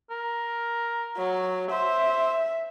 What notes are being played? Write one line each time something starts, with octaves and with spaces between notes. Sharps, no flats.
A#4
F#3
C5 E5